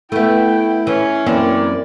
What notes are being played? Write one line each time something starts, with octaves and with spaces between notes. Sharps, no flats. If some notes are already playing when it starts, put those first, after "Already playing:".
A3 B3 E4 G5
E3 C#4
F#2 E3 A#3 C4 D5